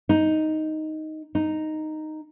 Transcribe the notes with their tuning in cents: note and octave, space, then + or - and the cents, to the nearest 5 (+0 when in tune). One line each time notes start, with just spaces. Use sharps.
D#4 +5
D#4 -5